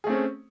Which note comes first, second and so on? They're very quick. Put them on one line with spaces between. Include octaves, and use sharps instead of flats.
G#4 A3 C4 C#4